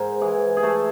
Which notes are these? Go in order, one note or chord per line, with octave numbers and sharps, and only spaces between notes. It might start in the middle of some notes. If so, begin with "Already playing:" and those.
Already playing: G#2 A#4 C5
E3 G#4
G#4
A3 A4